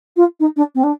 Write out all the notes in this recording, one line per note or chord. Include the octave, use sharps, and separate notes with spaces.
F4
D#4
D4
C4
D4